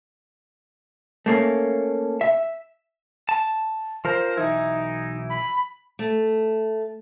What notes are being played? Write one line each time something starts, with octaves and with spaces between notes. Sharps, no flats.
A3 A#3 C#4
E5
A5
F3 A#4 C5
B1 E3 D#4 E4
B5
A3